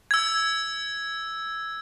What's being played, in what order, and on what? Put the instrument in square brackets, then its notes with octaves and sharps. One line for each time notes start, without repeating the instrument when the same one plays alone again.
[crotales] E6 G#6